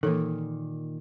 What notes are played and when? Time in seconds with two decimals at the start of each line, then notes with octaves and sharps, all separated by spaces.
0.03 A#2 D#3 E3 A4